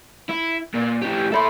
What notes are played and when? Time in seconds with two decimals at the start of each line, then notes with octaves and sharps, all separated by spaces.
0.29 E4
0.74 A#2
1.02 A2 G4
1.32 A4 C#5 E5 B5 C6